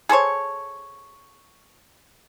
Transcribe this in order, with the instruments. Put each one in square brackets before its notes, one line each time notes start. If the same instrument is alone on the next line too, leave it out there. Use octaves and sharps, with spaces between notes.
[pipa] G#4 A4 C5 C#5